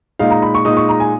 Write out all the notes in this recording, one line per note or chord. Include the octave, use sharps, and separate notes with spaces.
A#2 G#3 D#4 F5
A#5
B5
C#6
A#2 G#3 D#4 D#6
C#6
A#5
G#5